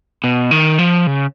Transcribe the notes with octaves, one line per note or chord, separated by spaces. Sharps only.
B2
D#3
F3
C#3